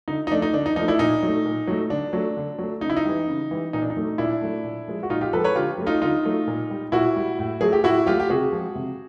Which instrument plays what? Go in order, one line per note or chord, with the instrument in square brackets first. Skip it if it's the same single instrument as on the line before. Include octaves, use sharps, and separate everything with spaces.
[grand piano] D3 D#4
D#4
F3 A3 D4
D#4
D3 D4
D#4
F3 A3 D#4
D4 E4
A#2 D#4
F#3 A3
A#2
F#3 A3
D3 D4
F#3 A3
D3
F#3 A3
C#3 D#4
E4
D#4
E3 G3
C#3
E3 G3
A#2 D#4
D4
D#4
F#3 A3
A#2 D4 E4
F#3 A3
A#2
F3 G#3
F#4
A#2 D#4 F4
F4 G4
F3 G#3 A4 B4
B4 C#5
D3 F4 G4
F#3 A3
D#4 F4
D3 D#4 F4
F#3 A3
A#2
G3
A#2 E4 F#4
G3
A2
F#3 A3 G#4
G4
A2 E4 F#4
F#3 A3 F4 G4
G4
C3 F#4 G#4
F3 G#3
C3